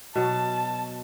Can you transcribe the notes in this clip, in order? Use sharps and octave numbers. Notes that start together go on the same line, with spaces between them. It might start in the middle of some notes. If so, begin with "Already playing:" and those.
B2 F#3 A5